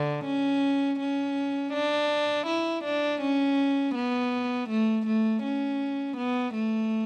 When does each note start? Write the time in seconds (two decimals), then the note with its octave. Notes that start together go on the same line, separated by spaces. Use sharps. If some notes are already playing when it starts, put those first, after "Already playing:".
Already playing: D3
0.25 C#4
1.00 C#4
1.73 D4
2.47 E4
2.84 D4
3.21 C#4
3.95 B3
4.69 A3
5.06 A3
5.43 C#4
6.17 B3
6.54 A3